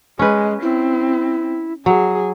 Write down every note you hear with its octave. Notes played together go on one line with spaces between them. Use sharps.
G#3 C#4 B4
C4 E4
F#3 G#4